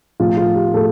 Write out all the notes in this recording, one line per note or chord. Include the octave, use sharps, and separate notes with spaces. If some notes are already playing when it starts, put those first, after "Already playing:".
A2 F3 F4
F4
G4
A2 A4